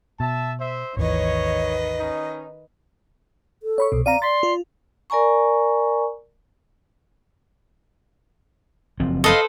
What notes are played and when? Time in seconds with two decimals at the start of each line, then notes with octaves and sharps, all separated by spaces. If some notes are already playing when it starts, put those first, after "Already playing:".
0.20 B2 E5 A5
0.59 C5 E5
0.97 G#1 D#2 D#3 E3 B4 C#5 D#5
2.00 C#4 D#4
3.63 A4
3.78 C#5 B5 C#6
3.92 C2 B2
4.06 C4 D5 F5 A#5 D#7
4.22 D5 C6 A6 B6
4.43 F4
5.10 A#4 D5 G#5 A#5 C#6
9.00 F#1 F3 C4
9.24 A4 B4 C5 D#5 F5